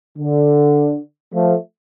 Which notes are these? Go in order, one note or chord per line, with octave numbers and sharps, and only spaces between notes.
D3
F3 A3